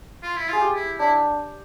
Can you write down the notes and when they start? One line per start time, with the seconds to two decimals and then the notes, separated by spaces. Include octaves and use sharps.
0.23 F4
0.37 E4
0.48 F4 G#4
0.61 G4
0.74 E4
0.98 D4 E4